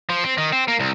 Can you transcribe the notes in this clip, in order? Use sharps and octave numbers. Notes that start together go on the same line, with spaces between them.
F3
C4
D#3
C4
A#3
C2